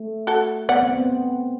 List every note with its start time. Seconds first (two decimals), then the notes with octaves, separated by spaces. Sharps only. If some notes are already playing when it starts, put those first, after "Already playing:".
Already playing: A3
0.27 F#4 A4
0.69 B3 D5 F#5
0.83 C4
0.95 B3